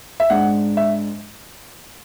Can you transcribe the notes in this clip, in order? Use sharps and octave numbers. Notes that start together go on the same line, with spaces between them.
E5
G#2 G#3 D4 F#5
E5